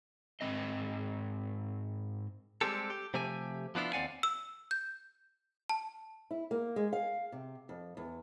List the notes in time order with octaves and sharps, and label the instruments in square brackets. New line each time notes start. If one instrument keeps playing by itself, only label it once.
[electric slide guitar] G#2 C4 D#5
[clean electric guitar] G3 G#3 C4 G4 A4
G4
C3 F3 A3 G4 G#5
F3 B3 D4 E4 F4
D#2 C4 D5 F5 F#5 G#5
[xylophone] E6
G6
A5
[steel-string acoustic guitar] E4
A#3
G#3
F5
C3
F2
E2